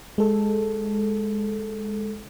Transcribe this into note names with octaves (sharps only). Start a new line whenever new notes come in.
G#3 A4